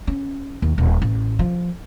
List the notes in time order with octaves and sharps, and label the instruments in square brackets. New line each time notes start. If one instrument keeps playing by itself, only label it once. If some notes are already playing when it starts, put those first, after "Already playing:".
[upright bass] C#4
D#2
D#1
A1
F3